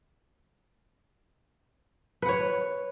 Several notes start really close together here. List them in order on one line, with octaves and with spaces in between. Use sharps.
B4 F#5 C#5